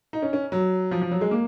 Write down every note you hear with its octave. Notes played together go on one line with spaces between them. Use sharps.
D#4
C#4
C#4
F#3
F3
F3
F#3
G#3
A#3